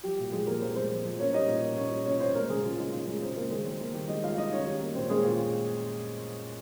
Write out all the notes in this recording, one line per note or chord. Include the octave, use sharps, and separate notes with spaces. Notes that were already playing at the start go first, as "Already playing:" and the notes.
F3 G3 G4
A#2
F3 G#3 G#4
F3 A#3 A#4
A#2 C4 C5
G#3 C4 C5
F3
F3
A#3 C#4 C#5
G3 D#4 D#5
A#2
A#3
A#2 C#4 C#5
G3
A#2 C#4 C#5
A#2 C4 C5
G#3 A#3 A#4
C#3 G#3 G#4
C#3 F4
G#3 D#4
C#3 F4
G#3 G#4
C#3 C4 C5
G#3 A#3 A#4
D#3 G#3 G#4
G#3 C4 C5
D#3 A#3 A#4
D#3 G3 G4
G#3 D#4 D#5
G#3 F4 F5
G#3 D#4 D#5
D#3 C#4 C#5
G3
A#3
A#2 C4 C5
G#3 A#3 G#4
A#2 F4